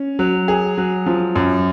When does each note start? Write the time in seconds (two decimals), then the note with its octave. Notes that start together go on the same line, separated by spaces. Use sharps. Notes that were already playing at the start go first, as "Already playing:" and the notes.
Already playing: C#4
0.19 F#3
0.48 G#4
0.78 F#3
1.06 F3
1.36 F#2